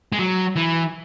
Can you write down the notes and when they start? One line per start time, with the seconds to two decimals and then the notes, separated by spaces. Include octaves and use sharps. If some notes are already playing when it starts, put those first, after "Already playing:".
0.12 G#3
0.19 F#3
0.56 E3